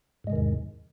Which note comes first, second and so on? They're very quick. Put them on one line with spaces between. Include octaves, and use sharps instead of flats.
G#2 G#3 C3 D#3 E2